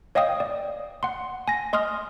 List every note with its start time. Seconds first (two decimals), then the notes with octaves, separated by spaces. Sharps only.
0.15 C#5 D#5 F5 G5 D#6
0.40 D5
1.03 F#5 C6
1.48 G#5 A#6
1.73 D#5 C6 D#6 F6